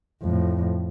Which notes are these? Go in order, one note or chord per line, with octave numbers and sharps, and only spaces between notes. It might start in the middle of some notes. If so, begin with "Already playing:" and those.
F2 A2